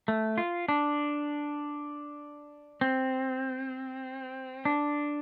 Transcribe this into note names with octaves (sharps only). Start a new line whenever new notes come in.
A3
F4
D4
C4
D4